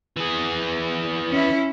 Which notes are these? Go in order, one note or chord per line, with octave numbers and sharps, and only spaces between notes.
E3 G#4
C#4 E4